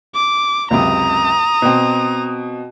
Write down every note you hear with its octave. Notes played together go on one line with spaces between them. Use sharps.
D6
C#2 F#2 C3 A#5 D#6
B2 C4